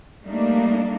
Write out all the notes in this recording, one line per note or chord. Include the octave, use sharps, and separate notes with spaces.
G3 A3 A#3 D4 D#4